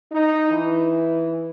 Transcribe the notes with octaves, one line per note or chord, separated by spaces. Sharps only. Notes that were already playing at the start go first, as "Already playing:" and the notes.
D#4
E3